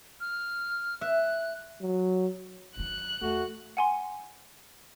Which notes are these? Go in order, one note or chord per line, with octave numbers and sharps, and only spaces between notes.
F6
E5 F#6
F#3
F#2 D#3 F#6
E2 A3 F#4
F#5 G#5 C6